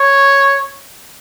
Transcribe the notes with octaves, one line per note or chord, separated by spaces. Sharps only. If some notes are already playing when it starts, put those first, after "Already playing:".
Already playing: C#5